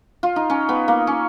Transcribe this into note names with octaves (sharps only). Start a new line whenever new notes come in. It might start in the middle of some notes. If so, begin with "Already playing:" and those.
F4
D#4
C#4
B3
A#3
C#4